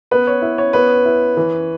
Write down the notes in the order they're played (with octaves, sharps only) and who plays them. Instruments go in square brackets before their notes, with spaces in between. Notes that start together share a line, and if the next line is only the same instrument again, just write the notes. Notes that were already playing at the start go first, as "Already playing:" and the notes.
[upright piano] B3 [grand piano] B4
[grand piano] C#5
[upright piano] E4
[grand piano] C#5
[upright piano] B3 [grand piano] B4
[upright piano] E4
E3